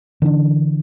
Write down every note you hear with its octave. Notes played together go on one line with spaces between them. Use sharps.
D3 E3 C4 D4